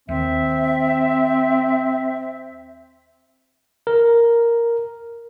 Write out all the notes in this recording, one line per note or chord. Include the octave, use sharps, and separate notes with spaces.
D#2 D#3 C4 E5
A#4